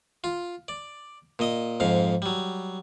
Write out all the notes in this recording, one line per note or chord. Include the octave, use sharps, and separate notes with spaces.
F4
D5
A#2 D#5 D#6
F2 G#2 F5
F#3 G3